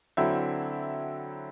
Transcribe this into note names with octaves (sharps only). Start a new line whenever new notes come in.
D3 F#3 C4 E4 E5